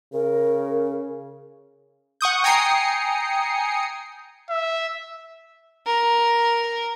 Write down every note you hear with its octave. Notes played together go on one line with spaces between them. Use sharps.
C#3 A#4
F#5 C#6 D#6 G6
G5 G#5 A#5 D#6 C7 C#7
E5
A#4